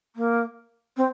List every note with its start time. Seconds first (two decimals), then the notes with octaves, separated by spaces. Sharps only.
0.16 A#3
0.97 C4